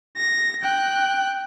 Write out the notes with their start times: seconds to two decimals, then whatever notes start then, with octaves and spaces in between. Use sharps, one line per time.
0.17 A#6
0.62 G5 F#6